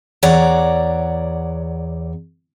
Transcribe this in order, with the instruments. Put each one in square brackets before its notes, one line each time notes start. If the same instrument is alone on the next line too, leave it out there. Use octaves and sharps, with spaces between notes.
[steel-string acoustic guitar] E2 C#5 D5 F#5 A#5